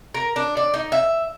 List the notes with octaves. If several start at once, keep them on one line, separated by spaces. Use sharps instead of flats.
A#4
D4
D5
D#4
E5